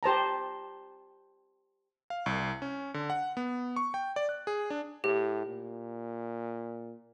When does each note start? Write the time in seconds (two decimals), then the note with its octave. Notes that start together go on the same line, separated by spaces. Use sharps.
0.03 G4 C5 A5 A#5
2.10 F5
2.26 C2
2.62 C#4
2.94 D3
3.10 F#5
3.37 B3
3.76 C#6
3.94 G5
4.16 D5
4.29 F#6
4.47 G#4
4.70 D4
5.04 A2 G4
5.46 A#2